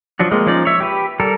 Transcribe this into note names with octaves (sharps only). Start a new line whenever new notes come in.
F3 F#3 D4 F#4
G#3 A#3 C4
F3 C#4 D#4 D5
C#5 E5
G4 B4
G3 A4 A#4